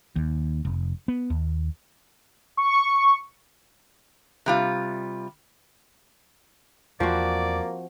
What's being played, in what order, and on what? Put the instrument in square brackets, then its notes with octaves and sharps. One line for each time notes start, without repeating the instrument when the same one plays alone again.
[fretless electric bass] D#2
F1
B3
D#2
[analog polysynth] C#6
[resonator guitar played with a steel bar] C3 G3 F4
[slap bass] E2 [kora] F3 C4 F#4 [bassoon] A#3 [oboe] D5